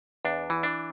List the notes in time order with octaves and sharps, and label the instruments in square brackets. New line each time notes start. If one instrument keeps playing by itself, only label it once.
[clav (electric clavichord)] E2 D4
E3
D4